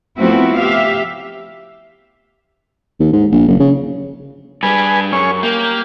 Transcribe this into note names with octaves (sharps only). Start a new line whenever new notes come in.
F3 A3 B3 C4 E4 F#4
G4 E5 F5
D#2
G#2
A#1
F#1
C#3
G2 G3 G#4 B4 G#5
F#2 C#4 G#4 C#5
A#3 G4